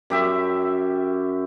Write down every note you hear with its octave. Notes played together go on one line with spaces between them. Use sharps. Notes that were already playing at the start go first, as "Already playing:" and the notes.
F#2 G4 E5